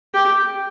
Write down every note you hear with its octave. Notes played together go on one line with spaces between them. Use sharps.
G4